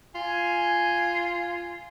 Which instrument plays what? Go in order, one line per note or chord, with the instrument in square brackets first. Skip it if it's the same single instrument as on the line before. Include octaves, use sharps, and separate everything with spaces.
[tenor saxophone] F4 [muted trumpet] G#5